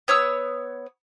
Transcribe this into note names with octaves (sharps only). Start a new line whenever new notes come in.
B3 C#5 D#6 E6